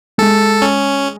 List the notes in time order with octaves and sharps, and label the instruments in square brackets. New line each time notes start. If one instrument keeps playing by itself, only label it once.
[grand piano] G#3 [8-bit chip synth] A4
[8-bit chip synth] C#4